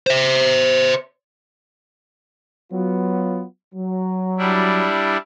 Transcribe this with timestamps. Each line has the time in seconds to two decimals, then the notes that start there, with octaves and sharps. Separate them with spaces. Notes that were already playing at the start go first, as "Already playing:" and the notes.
0.07 C5 E5
2.72 F#3 B3 F4
3.75 F#3
4.38 G3 D4 E4